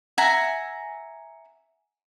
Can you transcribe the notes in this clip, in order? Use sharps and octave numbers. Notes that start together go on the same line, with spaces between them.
E5 F#5 G#5 A#5